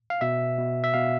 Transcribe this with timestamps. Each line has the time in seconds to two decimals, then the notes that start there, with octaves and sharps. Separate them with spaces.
0.10 F5
0.21 B2 E5
0.58 B2
0.84 E5
0.94 B2 F5